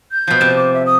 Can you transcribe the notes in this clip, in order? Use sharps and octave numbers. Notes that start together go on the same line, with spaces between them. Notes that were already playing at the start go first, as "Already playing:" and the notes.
G6
B2 F3
C3 A5
D6
E5
D#6